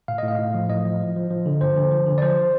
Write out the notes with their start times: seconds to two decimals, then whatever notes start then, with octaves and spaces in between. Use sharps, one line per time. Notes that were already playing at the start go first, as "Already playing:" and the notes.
0.08 A2 F5
0.18 A2 D#5
0.28 F5
0.39 A2
0.54 F3
0.69 A2 D#5
0.85 F3
1.00 F3
1.16 F3
1.30 F3
1.46 D3
1.61 G2 C5
1.77 D3
1.91 F3
2.07 D3
2.18 D5
2.22 F3 C5